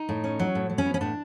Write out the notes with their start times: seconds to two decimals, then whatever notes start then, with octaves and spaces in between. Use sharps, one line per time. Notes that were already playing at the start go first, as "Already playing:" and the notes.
Already playing: D#4
0.09 A2
0.24 C#4
0.39 F#3
0.55 A2
0.70 F#3
0.78 C#4
0.86 B3
0.94 C#4
1.01 A2 D4